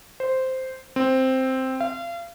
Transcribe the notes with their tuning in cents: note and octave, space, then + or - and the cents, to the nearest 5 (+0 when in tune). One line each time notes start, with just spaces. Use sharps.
C5 -5
C4 +0
F5 -35